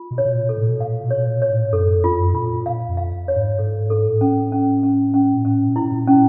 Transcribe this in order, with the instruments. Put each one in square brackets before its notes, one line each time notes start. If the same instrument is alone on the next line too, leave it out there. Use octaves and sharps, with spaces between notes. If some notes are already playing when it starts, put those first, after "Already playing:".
Already playing: [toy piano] F4
[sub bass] B2
[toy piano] C#5
[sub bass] B2
A#2
[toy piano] A4
[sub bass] A2
B2
[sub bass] A#2 [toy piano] F5
[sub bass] B2
[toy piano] C#5
[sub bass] A#2
[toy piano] C#5
[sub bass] A2
[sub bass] F#2 [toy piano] A4
[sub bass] F2
[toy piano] F4
[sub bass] F#2
[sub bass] B2 [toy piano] F4
[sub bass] A#2
[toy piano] F5
[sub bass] F2
[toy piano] F5
C#5
[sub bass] G#2
[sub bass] G#2 [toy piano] A4
[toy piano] A4
[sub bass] A2
[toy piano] C#4
C#4
C#4
C#4
[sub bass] A#2
[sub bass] A2 [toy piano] C#4
[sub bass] A#2
[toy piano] E4
[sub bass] A#2
[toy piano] C#4